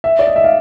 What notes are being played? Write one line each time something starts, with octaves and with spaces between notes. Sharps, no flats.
E5
D5
D#5
E5
F5